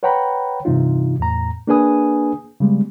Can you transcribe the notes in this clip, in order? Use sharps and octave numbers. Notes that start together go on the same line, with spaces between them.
B4 C#5 F#5 G5 A#5 B5
G2 C3 E3 D#4 F4
E2 A2 A#5
A#3 D4 G#4 B4 G#5 D#6
C#3 G3 G#3 B3